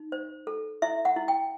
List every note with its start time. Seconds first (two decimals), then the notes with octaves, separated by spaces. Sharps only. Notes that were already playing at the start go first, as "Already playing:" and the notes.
Already playing: D#4
0.12 C5
0.47 A4
0.82 E4 E5
1.05 F#5
1.16 E4
1.28 G5